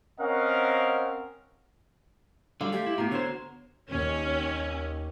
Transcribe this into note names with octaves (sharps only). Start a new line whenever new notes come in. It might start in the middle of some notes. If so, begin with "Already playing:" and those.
C4 C#4 A#4 D#5 F5 F#5
D3 F#3 G3 F5 C6 D6
A3 G4
E4
A2 B3 F#4 A#5
D3 C5 C#5
D#2 C#4